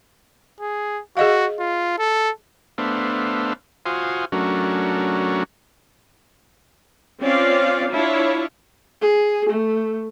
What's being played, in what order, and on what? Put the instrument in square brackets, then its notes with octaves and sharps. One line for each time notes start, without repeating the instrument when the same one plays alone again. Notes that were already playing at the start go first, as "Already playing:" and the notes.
[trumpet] G#4
[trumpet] F#4 [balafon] G#4 D#5 F5
[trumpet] F4
A4
[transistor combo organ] A3 B3 D4 C5 E5 F5
F4 F#4 C5 F5 G#5 D#6
F#3 A3 C#4 D4 F#4 A#4
[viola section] C4 C#4 F4 D5 F5
D4 E4 F4 C#5
[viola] G#4
A3